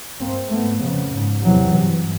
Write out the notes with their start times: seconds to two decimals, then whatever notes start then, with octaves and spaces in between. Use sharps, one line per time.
0.21 G2 A#3 C4
0.51 G#2 A3 B3
0.83 F2 C#3
1.14 G#2
1.45 E2 C3 E3 F#3
1.75 G2